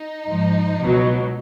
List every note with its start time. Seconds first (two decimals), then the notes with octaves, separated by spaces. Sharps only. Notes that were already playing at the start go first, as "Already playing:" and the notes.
Already playing: D#4
0.27 G#2 F3
0.80 C#2 B2 F#3